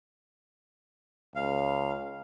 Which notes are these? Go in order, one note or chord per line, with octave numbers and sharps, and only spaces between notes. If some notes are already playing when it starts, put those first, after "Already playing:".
C#2 F5